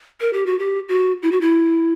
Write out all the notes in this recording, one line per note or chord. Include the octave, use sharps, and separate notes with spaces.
A#4
G4
F#4
G4
F#4
E4
F#4
E4